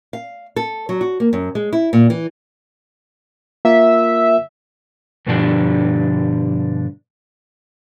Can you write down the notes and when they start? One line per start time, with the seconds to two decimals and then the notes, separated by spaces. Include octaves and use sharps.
0.13 F5
0.56 A4
0.89 F#3
1.01 F#4
1.20 A#3
1.33 F#2
1.55 G#3
1.73 E4
1.93 A#2
2.10 E3
3.65 A#3 F4 A#4 E5
5.27 G2 B2 D3 F3 D4 G4